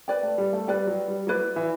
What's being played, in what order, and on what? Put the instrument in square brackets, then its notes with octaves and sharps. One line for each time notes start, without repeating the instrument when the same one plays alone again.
[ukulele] B4 D5 G5
[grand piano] A3
G3
A3
[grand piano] G3 [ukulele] B4 D5 G5
[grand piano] F#3
G3
[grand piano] F#3 [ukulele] E4 B4 D5
[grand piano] E3